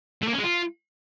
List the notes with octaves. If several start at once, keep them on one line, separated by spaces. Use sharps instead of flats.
A3
A#3
C#4
G#3
F4